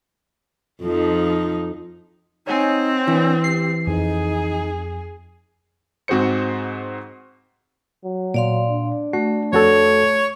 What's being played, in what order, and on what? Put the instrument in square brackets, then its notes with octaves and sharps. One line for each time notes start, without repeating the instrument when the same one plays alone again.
[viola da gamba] F2 F3 D#4
[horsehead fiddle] C4 [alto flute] D#4 [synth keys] C#5 F#5 G#5
[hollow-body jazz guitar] E3 [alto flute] D4
[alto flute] G4 [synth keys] C7
[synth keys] F2 [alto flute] D#4 [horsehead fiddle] G#4
[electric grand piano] G#2 C4 F#4 G#4 C5 C#7
[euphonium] F#3
[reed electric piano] A#2 [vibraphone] D5 F5 C6
[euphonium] D4
[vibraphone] A3 [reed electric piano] F#4
[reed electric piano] F2 F#4 A4 [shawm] C#5